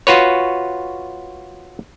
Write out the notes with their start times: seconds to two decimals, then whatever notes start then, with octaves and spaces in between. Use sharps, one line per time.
0.07 F4 F#4 B4 C#5